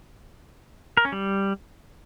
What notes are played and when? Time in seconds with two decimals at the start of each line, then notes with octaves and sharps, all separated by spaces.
0.97 A#4
1.05 C#4
1.12 G3